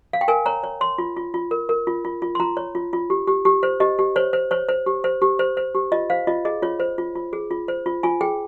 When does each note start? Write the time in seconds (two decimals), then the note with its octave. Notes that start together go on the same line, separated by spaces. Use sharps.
0.13 F5
0.21 G5
0.28 A#4 G#5
0.46 C#5 A#5
0.64 C#5
0.81 C#5 C6
0.98 F4
1.16 F4
1.34 F4
1.51 A#4
1.69 A#4
1.87 F4
2.05 F4
2.22 F4
2.35 C6
2.40 F4 A#5
2.57 C#5
2.75 F4
2.93 F4
3.10 G4
3.27 G4
3.45 G4
3.63 C5
3.80 G4 D#5
3.99 G4
4.16 C5 C#5
4.33 C5
4.51 C5 C#5
4.69 C5
4.86 G4
5.04 C5
5.22 G4
5.39 C5
5.57 C5
5.75 G4
5.92 F4 D#5
6.10 C5 F5
6.27 F4 D#5
6.45 G#4 D#5
6.62 F4 C#5
6.80 C5
6.98 F4
7.15 F4
7.33 G#4
7.51 F4
7.68 C5
7.86 F4
8.03 F4 G#5
8.21 G#4 G5